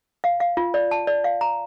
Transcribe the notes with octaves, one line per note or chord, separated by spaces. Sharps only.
F5
F5
F4
D5
A5
D5
F5
A#5